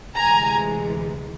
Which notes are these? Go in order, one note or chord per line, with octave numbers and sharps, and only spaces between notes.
D2 C3 E3 G#3 G#5 A#5